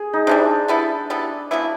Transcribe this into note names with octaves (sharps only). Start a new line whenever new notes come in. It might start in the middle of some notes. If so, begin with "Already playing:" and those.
Already playing: G#4
D#4
C3 E3 G3 D4
G3 B3 E4 A4
G3 B3 E4 A4
C#3 F#3 B3 E4